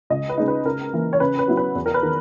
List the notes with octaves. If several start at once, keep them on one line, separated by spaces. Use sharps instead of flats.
C#2 D#5
B4
C#3 G#3 D#4
B4
C#3 A#4
E3 A#3
C#5
C#3 B4
B4
F#3 B3 E4
B4
E2
A#4
B4
D#3